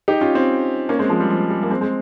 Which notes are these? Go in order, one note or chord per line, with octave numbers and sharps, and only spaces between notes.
D#4 G4
C#4 F4
C4 D#4
A#3 C#4
G#3 C4
F3 G#3
G3
F3
G3
A#3
G#3 C4
G#3 C4